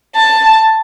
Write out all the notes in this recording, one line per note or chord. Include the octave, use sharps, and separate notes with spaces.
A5